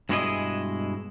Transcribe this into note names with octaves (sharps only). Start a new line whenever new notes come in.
G2 B2 G#3 E4 G#4 D#5